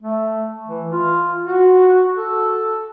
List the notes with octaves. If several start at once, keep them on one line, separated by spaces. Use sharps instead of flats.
A3
E3
F4
F#4
A4